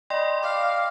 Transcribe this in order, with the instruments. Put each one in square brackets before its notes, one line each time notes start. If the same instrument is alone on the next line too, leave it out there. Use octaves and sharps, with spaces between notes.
[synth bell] D5 G5 C6 [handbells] D#5 B5
[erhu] F5 [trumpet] D6